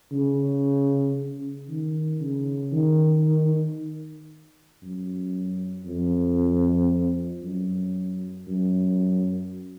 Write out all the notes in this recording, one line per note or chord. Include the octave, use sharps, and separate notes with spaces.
C#3
C#3
D#3
C#3
D#3
F#2
F2
F#2
F#2